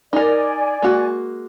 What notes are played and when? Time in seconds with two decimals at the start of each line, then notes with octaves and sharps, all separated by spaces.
0.13 D#4 A#4 D5 G#5
0.82 G#3 A#3 F#4